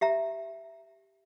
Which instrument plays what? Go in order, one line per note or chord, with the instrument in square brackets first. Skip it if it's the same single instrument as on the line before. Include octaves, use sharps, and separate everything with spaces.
[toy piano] G4 E5 A#5